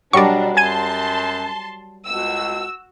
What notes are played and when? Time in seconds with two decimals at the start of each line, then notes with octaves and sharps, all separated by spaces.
0.13 B2 F#3 G3 D4 A#4 D5 C#6
0.57 F#2 G#5 A5 C6 G#6 D#7
2.07 C#2 F#4 E6